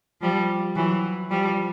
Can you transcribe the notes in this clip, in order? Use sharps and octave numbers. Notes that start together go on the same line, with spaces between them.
F3 G3
E3 F#3
F3 G3